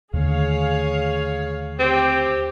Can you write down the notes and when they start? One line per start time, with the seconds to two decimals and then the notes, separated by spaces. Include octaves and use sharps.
0.13 D#2 D3 A3 G#4 C#5 F5
1.79 C4 G4